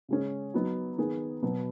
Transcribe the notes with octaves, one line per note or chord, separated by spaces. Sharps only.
C#3 G#3 C#4 G#4
F#3 B3 D#4 F#4
D#3 B3 G#4
B2 F#3 B3